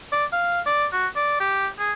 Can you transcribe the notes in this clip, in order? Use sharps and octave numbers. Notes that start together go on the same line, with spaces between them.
D5
F5
D5
F#4
D5
G4
G#4